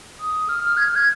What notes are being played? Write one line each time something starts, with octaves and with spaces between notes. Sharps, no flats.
D#6
F6
G#6
F6
G#6